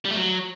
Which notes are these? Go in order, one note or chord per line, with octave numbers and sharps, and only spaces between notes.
G3
A3
F#3